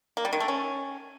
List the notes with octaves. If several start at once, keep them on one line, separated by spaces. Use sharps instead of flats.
A#3
G3
D#3
A3
C#4